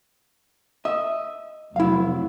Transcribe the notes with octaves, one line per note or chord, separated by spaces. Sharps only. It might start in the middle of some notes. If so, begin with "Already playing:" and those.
D#5 E5
F1 C3 F#3 E4 F5